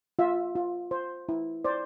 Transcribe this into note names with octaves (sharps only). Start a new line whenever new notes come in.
F4 E5
F4
C5
E4
C5 D5